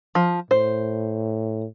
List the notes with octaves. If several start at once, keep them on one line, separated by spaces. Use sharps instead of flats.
F3
A2 C5